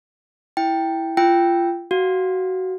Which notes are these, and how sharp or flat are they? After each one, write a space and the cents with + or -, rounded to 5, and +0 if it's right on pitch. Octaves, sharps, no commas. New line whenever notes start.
E4 +0 G5 +0
F4 -25 G5 +0 E6 +0
F#4 +15 F5 +15